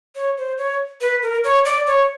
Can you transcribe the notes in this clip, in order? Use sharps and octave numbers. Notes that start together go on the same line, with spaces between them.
C#5
C5
C#5
B4
A#4
C#5
D5
C#5